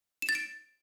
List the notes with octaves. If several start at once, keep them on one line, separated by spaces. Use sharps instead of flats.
E7
A6
D7